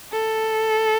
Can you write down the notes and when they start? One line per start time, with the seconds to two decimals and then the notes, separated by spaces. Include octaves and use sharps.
0.12 A4